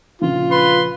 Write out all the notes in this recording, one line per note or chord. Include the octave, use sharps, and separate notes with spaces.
A#1 C#3 F4
B4 C6